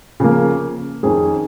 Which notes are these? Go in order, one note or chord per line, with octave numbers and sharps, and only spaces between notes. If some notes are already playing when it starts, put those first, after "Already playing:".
C#3 F3 A#3
F2 D#3 C#4 G#4